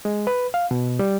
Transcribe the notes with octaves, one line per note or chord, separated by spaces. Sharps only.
G#3
B4
F5
B2
G3